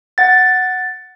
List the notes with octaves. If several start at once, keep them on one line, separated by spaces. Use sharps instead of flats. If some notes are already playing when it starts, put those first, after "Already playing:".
F#5 A6